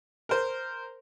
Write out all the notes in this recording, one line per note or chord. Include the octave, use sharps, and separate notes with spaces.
A#4 C5